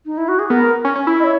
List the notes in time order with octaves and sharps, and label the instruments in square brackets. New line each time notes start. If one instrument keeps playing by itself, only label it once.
[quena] D#4
E4
F#4
G#4
[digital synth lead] B3 [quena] A#4
[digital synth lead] C#4
C#4
E4
[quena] D#5
C#5